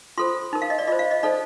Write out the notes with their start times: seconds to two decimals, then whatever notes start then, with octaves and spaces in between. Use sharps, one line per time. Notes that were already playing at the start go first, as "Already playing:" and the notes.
0.18 F4 A4 C5 C6
0.53 D#4 A#4
0.62 F5
0.70 D#5
0.78 D5
0.87 F4 C5 D#5
0.99 F5
1.11 D#5
1.23 D#4 A4 C5 D5